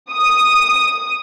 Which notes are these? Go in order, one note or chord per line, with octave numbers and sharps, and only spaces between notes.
D#6